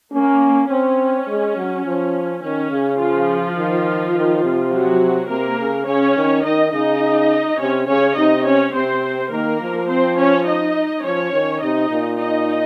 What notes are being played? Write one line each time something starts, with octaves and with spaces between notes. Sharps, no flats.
A#3 C#4
C4 C#4
G#3
F#3
F3
D#3 C#4
C#3
F3 F4
D#3
D#3
C3
F#3 F#4
C3 A#3 A#4
C#3
C#3 C#4 C#5
D#3
D#3 D#4 D#5
C#3 D#4 D#5
C3 C#4 C#5
C#3 C#4 C#5
C3 D#4 D#5
C#4 C#5
C3 C4 C5
D#3 A#3 A#4
F3
C4 C5
C#4 C#5
D#4 D#5
F3 C#4 C#5
D#3
C3 D#4 D#5
A#2
D#4 D#5